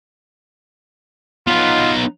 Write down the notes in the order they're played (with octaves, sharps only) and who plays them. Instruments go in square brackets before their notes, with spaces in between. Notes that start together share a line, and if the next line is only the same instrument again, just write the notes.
[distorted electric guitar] B3 D#4 [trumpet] F4